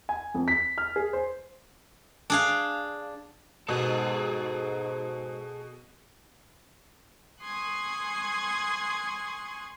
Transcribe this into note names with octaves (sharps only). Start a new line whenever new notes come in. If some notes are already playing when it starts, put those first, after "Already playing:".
G#5
F2
B6
F6
G#4
C5
D4 G#4 F5
G#2 B2 G#4 A4
G#5 C6 C#6 D#6 F#6 G#6